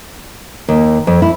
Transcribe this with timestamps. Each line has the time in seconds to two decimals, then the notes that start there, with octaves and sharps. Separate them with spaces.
0.69 D#2
1.07 F2
1.22 E4